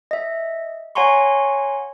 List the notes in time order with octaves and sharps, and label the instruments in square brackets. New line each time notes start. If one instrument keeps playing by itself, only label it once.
[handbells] D#5 E5
C#5 F#5 G#5 A#5 C6 C#6